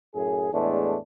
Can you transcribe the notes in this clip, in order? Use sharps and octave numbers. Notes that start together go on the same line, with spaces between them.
F#2 A2 G#4
E2 A2 G#3 A3 D4